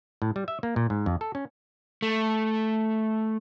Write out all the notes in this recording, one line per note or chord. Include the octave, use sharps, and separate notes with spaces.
A2
G3
E5
A#3
A#2
G#2
F2
A4
C#4
A3